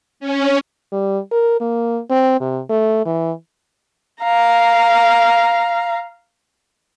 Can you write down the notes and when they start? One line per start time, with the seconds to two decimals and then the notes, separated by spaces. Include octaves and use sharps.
0.20 C#4
0.92 G3
1.31 A#4
1.61 A#3
2.11 C4
2.41 C3
2.70 A3
3.06 E3
4.23 F5 A#5